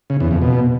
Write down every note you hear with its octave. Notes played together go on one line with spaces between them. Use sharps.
C#3
E2
F2
B2